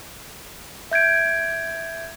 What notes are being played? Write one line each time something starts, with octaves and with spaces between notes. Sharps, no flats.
E5 G6 G#6 D7